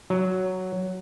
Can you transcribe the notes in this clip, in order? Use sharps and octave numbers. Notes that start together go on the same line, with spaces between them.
F#3